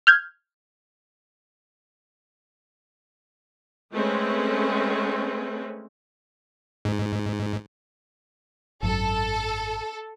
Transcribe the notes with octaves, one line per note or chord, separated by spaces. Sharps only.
F6 G6 G#6
G#3 A3 C4 C#4 B4
G#2
G#1 F#2 F#3 A4